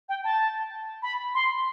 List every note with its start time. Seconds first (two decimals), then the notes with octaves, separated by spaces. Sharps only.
0.09 G5
0.24 A5
1.02 B5
1.34 C6